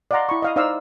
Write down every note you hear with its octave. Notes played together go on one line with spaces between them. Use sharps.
D5 D#5 F5 F#5 A#5 C6
E4 B5 C#6
D#5 F5 D#6
D#4 C5 D5 F5 C6 E6